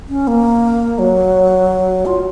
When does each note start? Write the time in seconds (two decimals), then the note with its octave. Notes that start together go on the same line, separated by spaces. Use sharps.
0.09 C#4
0.27 A#3
0.98 F#3
2.06 F4